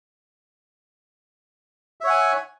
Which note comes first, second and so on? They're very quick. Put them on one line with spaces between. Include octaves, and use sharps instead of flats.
E5 C#5 F#5 G#5